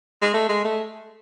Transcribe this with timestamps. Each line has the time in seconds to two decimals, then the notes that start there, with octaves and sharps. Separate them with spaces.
0.22 G#3
0.34 A3
0.49 G#3
0.65 A3